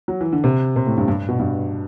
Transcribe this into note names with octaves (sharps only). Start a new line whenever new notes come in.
F#3
E3
D3
C3
C3
A2
G2
G2
B2
G2